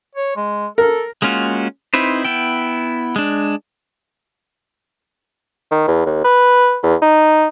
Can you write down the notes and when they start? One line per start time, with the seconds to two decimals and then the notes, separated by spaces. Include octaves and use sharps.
0.15 C#5
0.36 G#3
0.78 A4 A#4
1.22 G#3 A#3 C#4 F4 F#4
1.94 C4 D#4 E4 B4 C5
2.24 B3 E4 G5
3.16 G#3 D4
5.71 D#3
5.88 E2
6.06 D#2
6.25 B4
6.83 E2
7.02 D#4